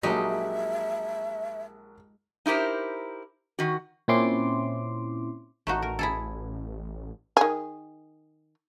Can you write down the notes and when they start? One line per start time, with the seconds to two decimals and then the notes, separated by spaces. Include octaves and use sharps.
0.03 A#1 F#3 G#3 D#4 G4 E5
2.46 D#4 E4 G4 A#4 C5
3.59 D#3 F#4
4.08 A#2 C4 C#4 E4 C6 D6
5.67 A1 A3 D#4 F#4
5.82 A#4
5.99 E4 G#4 A4
7.37 D#3 G#4